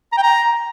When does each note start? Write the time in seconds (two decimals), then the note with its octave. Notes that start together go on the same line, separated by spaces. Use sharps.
0.12 A#5
0.17 G5
0.22 A#5